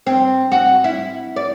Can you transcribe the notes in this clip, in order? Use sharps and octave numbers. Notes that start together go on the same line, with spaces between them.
C4
F#4
E4
D5